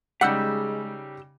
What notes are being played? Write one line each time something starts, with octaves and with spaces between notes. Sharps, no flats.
C#3 G3 G#3 D#4 G4 F#5 E6 G6